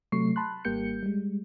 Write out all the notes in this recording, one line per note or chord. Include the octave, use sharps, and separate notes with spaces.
C3 F#3 A3 C#6 C7
A5 B5 C6 F#6
G#1 G3 A#3 G4 G6 C#7
G3 G#3